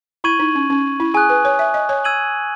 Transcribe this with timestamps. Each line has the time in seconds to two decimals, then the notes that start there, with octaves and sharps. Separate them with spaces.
0.24 E4 C#6 G#6 D#7 F#7
0.39 D#4
0.55 C#4
0.70 C#4
1.00 E4
1.14 G#4 G#5 D#6 F#6
1.30 B4
1.45 C#5
1.59 E5
1.74 D#5
1.89 C#5
2.04 E6 G#6 D#7 F#7